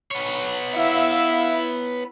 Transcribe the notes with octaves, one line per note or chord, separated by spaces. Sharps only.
B3 C#5
E4 E5 F5